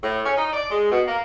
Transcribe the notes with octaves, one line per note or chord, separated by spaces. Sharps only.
A2
C#4
D#4
D5
G#3
B2
A#3